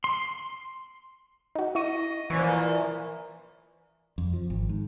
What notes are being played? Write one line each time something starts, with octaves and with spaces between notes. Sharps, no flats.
C6
D#4 F#4
E4 D#5 C#6 D#7
A#2 E3 F3 C#4
A#4
F2
F3
G#1
G#2